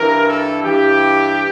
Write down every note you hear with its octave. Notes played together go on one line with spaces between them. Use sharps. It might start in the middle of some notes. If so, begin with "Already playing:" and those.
Already playing: G2 E3 A#4
A4
G2 E3 G4